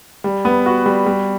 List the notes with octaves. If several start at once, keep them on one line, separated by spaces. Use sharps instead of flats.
G3
B3
F#4
G3
G3